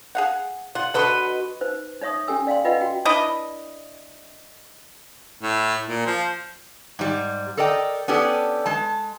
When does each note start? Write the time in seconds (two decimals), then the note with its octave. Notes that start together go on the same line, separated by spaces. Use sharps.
0.15 G#4 F5 F#5
0.75 F4 F#5
0.94 D3 F#4 A4 B4 D#5 C6
1.61 D#4 B4 C5
2.02 D#4 C#5 E5 C#6 D#6
2.28 C#4 G4 A4 G#5 E6
2.47 D5 F5 G5 C6
2.65 F4 B4 D#5 F5 F#5
2.81 F#4 G5
3.05 D4 E4 B4 D#5
5.43 A2
5.87 A#2
6.06 F3
6.99 G#2 G3
7.57 A4 A#4 D5 D#5 G5
8.08 B3 C#4 D4 G4 A4
8.66 G#3 A5